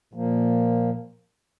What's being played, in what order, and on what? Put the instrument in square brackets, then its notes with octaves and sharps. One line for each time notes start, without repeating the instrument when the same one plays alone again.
[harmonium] A#2 F3 A#3